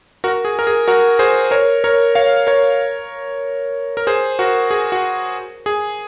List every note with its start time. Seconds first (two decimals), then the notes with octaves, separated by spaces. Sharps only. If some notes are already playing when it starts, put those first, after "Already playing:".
0.24 F#4 A#4
0.45 G#4
0.59 A#4
0.67 G#4
0.88 F#4 A#4
1.19 G#4 C5
1.51 A#4 C#5
1.84 A#4 C#5
2.15 C#5 F5
2.47 A#4 C#5
3.97 A#4
4.07 G#4 C5
4.39 F#4 A#4
4.71 G#4
4.92 F#4
5.66 G#4